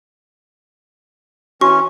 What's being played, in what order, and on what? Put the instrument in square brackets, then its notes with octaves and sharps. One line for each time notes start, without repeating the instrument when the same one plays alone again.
[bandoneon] E3 C#4 [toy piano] F#4 [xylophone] C#6